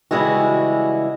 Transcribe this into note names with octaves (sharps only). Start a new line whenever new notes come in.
C#3 E3 G3 G#3 E4 F#4